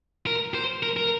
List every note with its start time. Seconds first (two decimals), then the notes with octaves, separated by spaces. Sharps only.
0.27 A#4
0.55 C5
0.83 A#4
0.96 A#4